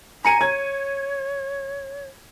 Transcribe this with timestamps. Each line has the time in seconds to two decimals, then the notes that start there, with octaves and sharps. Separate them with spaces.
0.25 G#5 A#5 C#7 D#7
0.41 C#5 G#6